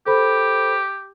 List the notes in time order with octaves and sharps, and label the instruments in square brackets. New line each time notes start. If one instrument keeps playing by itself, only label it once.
[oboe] G4 [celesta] A4 C5 B5